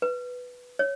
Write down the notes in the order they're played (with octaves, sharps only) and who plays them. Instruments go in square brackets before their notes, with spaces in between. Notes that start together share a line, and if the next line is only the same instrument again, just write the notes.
[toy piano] B4
C#5